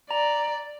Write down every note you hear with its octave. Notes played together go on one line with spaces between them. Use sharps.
D5 A#5